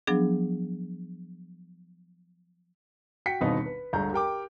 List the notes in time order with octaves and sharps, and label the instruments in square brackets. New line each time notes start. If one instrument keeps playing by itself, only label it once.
[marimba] F3 F#3 B3 D4 G#4
[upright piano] F#4 G5 B6 C#7
G1 D#2 B2 B3 C4 D#4
B4
G1 D2 D3 G#3 A#5 G6
G4 A#4 G5 D6